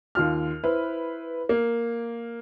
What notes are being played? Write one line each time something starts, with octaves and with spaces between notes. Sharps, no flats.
D#2 F4 F6
E4 B4 C5
A#3